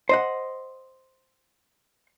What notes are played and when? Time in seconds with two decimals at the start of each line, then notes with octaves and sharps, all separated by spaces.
0.09 C5 D#5 F#5